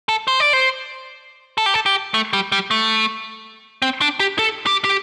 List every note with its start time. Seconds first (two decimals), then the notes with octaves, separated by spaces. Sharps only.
0.09 A4
0.28 C5
0.40 D5
0.53 C5
1.58 A4
1.66 G4
1.74 A4
1.86 G4
2.14 A3
2.33 G3
2.52 G3
2.71 A3
3.82 C4
4.01 D4
4.20 G4
4.39 A4
4.66 G4
4.84 G4